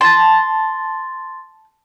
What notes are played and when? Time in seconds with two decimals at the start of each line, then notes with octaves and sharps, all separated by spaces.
0.01 A5 C6 A6